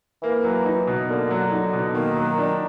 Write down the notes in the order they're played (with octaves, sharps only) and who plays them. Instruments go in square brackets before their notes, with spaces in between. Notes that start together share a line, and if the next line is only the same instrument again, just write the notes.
[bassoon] E3 [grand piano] A#3
[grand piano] F#3
D#4
B2
[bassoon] D3 [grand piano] A#3
[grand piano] F#3
D#4
B2
[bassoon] D#3 [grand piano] A#3
[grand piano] F#3
D4